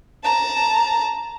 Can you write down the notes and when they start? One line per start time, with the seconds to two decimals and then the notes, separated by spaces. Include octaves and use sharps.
0.23 A5 A#5